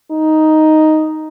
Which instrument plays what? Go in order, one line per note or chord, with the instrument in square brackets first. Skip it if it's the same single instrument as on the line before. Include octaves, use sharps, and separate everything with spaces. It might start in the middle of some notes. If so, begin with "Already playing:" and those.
[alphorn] D#4